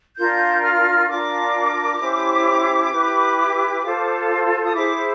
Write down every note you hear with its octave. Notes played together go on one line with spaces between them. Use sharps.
D4 F4 A#4 G6
F6
D4 F4 A#4 D6
C#4 E4 G4 C5
E4 G4 B4
F4 A4 C5
D#6
E4 G#4 C5 D6